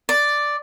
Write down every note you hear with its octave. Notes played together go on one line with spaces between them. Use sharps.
D5